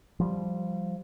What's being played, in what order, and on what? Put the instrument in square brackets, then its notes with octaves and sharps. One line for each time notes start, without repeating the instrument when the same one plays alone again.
[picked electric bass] F3 G3